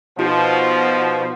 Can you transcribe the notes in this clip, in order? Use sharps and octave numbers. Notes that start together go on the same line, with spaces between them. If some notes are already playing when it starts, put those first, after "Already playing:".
B2 F3 D#4 F4 G4